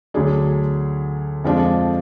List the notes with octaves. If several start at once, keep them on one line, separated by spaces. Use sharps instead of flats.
D2 D3 F#3 D4 G#4
F2 F3 G#3 D4 F4